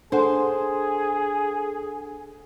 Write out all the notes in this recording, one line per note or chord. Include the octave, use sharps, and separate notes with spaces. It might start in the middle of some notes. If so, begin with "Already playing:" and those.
D4 G#4 A4 C5 F#5